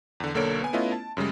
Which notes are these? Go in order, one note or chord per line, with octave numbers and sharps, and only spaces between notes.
E2 D3
B1 D3 A#3 A4 C#5 D7
B3 G#5
A3 B3 C#4 E4 F4 D#5
A5
F#2 C#3 G3 G#3